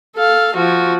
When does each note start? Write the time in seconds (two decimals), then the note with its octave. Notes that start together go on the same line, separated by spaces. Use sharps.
0.16 A4 F5
0.54 F3 F#4